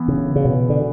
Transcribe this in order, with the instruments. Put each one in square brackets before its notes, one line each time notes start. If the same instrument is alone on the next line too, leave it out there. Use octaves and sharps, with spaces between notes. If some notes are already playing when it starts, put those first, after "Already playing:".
Already playing: [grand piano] E3 B3
[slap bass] C#3
C#3
B2
D3